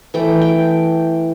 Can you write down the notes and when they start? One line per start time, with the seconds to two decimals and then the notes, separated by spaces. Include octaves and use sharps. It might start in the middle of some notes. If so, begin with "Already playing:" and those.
0.14 E3 A3 G5
0.42 G5